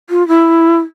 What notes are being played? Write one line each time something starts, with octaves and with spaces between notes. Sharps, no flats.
F4
E4